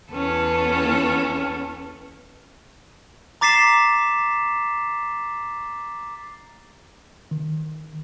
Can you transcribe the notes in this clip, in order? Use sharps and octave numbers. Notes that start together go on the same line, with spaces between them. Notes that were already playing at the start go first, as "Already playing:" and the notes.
E2 C#4 A4 B4
A#5 D6 A6 B6 C7 E7
D#3